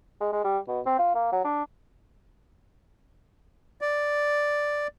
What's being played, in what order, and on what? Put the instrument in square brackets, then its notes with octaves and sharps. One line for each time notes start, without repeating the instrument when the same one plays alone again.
[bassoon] G#3
G#3
G3
B2
C4
F4
A#3
F#3
D4
[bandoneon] D5